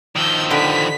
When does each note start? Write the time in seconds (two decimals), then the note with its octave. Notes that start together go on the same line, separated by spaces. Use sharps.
0.16 D#3 F3 E6 G6
0.50 D3 G4 B4 B6